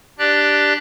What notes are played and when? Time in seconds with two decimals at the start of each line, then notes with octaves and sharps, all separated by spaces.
0.19 D4 G4 D5 F#6